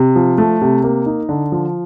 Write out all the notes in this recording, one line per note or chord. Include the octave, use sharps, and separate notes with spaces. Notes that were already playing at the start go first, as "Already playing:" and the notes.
Already playing: C3
F3
A3
C3
A#3
D#4
D3
F3